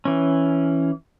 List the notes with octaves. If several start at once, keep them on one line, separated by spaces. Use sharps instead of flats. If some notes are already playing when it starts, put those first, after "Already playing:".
E3 C#4